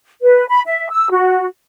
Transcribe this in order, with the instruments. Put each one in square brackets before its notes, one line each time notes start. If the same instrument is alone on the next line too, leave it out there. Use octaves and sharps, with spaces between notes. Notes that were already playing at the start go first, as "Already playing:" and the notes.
[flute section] B4
B5
E5
E6
F#4